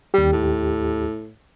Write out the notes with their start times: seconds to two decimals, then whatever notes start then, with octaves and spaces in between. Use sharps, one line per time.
0.14 D#2 G3 G4
0.32 A2